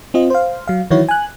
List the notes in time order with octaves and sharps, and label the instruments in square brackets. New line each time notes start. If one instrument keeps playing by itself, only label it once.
[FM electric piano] C4 F4 D#5
C5 F5
F#3 F5
D#3 E3 F#3 E4 F#4 C#5
G#5 F#6